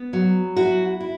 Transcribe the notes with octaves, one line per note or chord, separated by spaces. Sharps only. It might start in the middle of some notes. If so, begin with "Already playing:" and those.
Already playing: B3
F#3
E4 F#4
E4